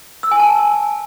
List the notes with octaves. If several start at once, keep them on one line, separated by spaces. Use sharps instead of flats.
E6
G#5
A5